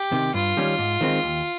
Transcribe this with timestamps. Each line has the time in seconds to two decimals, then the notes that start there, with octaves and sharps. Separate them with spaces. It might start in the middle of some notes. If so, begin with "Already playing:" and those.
Already playing: G4
0.12 C3 D#3
0.34 G2 F4
0.57 D#3 G3 C#4
0.78 G#2
1.01 D#3 G#3 C4 D#4
1.23 D#2